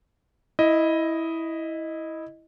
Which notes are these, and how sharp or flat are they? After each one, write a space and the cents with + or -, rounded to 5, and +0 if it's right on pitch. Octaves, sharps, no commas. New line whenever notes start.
E4 -10 D#5 +5